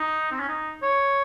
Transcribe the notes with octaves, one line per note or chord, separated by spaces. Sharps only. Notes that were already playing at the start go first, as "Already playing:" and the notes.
Already playing: D#4
C4
C#4
D#4
C#5